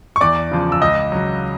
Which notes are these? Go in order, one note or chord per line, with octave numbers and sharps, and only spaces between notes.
C#6
E2 D5 D6
C#3 F3
E6
C#2 D#5 D#6
C#3 F#3